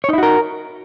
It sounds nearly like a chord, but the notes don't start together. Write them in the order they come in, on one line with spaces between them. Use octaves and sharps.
C#5 D#4 E4 F#4 A#4